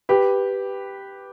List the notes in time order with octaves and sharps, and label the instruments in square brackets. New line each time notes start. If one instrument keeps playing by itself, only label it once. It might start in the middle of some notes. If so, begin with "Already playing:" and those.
[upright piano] G4 B4